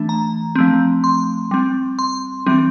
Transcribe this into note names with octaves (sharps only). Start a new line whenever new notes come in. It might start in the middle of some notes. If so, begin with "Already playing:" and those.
Already playing: E3 A3 D4
A#5
F3 A3 C4
C6
G3 C4
C6
E3 G3 C4